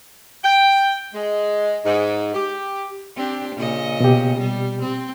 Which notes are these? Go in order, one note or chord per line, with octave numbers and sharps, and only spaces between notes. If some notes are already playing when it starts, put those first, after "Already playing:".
G5
G#3
G#2
G4
C4 D4 G4
A#2 C#3 D#5
B2 G4
G3
C4